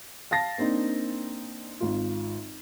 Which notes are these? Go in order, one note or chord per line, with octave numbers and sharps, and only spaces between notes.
F5 A5 A6 A#6 C7
A#3 C4 D4 D#4
G#1 F4